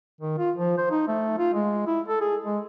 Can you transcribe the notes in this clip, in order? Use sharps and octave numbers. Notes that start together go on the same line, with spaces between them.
D#3
F4
F3
C5
D#4
A3
F4
G#3
E4
A4
G#4
G#3